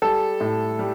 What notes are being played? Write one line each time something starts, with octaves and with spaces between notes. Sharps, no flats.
G3 A4
A2
G3